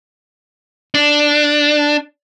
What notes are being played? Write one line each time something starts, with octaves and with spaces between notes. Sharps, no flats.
D4